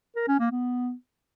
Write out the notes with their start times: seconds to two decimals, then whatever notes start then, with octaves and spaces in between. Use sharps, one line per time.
0.16 A#4
0.28 C#4
0.40 A#3
0.51 B3